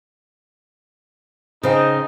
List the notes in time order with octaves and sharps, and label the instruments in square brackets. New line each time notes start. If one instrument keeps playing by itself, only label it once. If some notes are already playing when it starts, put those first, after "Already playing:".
[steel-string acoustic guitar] C#3 C5 G5 [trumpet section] D#4